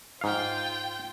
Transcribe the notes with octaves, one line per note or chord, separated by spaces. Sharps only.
G#2 F4 F5 G5